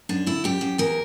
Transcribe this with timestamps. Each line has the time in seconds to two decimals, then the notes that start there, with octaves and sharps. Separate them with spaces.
0.09 F#2 D4
0.26 D3 E4
0.44 F#2 G4
0.61 F#2
0.78 E2 A#4